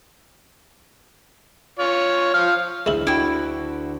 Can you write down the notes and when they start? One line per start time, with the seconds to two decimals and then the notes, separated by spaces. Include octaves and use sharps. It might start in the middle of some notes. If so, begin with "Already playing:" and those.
1.79 F4 C#5
2.34 F3 F5
2.86 D2 G#3 E4
3.07 D3 E4 F#4 G5 D6